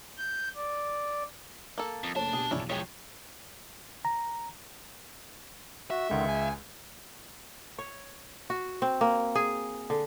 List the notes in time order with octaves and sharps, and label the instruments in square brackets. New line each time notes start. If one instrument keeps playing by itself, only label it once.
[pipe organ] G6
D5
[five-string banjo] A#3 A4
[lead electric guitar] F2
[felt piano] F#1 A3 C#5 [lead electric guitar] D4 A5
[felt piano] B2 G4 [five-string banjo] G#4
[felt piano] B1 E2 [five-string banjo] C#4 D4 E4
[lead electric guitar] F3 G#3 [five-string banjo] C#5 G5 G#5
[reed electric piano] A#5
[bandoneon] F#4 [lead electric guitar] E5
[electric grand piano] C#2 G#3 [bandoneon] D3 D#3
[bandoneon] G#5
[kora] C#5
F#4
C4
A#3
G#4
D3